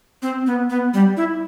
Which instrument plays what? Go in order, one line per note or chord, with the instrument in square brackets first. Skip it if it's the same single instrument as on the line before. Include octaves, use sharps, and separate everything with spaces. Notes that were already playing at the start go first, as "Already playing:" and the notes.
[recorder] C4
B3
B3
G3
E4